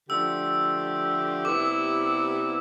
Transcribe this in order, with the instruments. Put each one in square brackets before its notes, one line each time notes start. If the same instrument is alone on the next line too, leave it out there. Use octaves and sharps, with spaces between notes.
[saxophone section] D3 F3 A3 D4 G4 [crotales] E6
[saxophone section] C3 G3 B3 E4 [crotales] D6